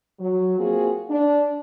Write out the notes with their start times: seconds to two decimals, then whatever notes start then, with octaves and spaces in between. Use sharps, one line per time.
0.19 F#3
0.57 A#3 C4 F4 F#4 G#4
1.08 D4